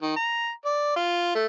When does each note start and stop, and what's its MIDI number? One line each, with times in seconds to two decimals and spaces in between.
0.02 0.14 51
0.16 0.50 82
0.66 0.93 74
0.96 1.33 65
1.35 1.46 57